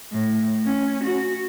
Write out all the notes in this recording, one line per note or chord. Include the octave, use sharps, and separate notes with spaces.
A2
C#4
F#4